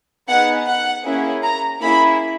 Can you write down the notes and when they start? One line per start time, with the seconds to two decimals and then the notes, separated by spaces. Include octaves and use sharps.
0.28 B3 D#4 G#4 F#5
0.67 F#5
1.05 A#3 C#4 E4 G#4
1.44 A#5
1.81 A#3 C#4 E4 G#4 B5